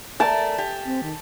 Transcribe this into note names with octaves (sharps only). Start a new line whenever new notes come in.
A3 A#4 D5 A5
G4
C4
D#3